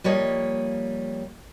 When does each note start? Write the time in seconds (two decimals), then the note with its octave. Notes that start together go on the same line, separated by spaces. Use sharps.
0.04 F3 G3 A#3 C#5 D#5